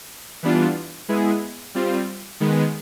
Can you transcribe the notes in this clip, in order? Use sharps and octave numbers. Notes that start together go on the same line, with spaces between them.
E3 G3 B3 D4 F4
G#3 B3 E4 G#4
G3 C4 F4
D#3 G#3 B3